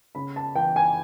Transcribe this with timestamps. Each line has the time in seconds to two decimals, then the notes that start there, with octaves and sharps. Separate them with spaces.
0.15 C#3 B5
0.36 A5
0.55 E3 G5
0.76 G#5